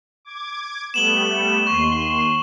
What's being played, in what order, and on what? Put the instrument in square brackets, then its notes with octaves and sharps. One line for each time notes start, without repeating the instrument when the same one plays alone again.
[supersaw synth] D6 G#6
[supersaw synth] G3 A3 B3 [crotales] E7 F#7 G7
[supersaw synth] D#2 C6 [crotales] C#6